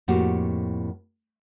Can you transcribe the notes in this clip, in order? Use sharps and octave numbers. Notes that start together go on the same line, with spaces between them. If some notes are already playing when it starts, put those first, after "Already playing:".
F2 A2 A#3 F#4 G4